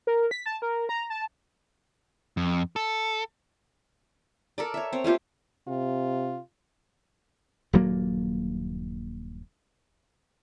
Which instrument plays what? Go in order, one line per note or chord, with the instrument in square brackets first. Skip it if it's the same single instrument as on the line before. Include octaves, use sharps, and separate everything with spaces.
[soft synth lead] A#4
B6
A5
A#4
A#5
A5
[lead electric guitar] F2
A4
[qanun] A4 A#4 D5
C#5 E5
C4 C#5
A3 A#3 F4 G4
[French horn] C3 [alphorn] F4
[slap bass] D#1 G2 F#3 A#3